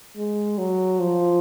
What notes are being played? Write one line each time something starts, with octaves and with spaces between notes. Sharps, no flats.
G#3
F#3
F3